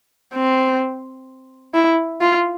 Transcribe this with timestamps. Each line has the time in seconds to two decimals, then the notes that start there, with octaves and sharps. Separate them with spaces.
0.34 C4
1.74 E4
2.21 F4